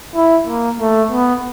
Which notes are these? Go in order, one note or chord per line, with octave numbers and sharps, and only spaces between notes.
E4
A#3
A3
B3